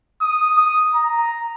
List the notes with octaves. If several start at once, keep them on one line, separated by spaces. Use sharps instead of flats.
D#6
D#6
A#5